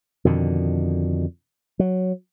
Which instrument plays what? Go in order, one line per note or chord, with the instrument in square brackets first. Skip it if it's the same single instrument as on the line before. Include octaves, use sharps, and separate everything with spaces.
[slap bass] F2 B2 D3 D#3
F#3